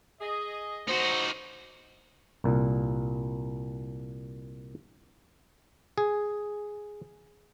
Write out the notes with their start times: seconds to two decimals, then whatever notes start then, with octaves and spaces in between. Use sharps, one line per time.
0.20 G#4 D#5
0.88 D#4 F#4 C5
2.44 C2 A#2
5.98 G#4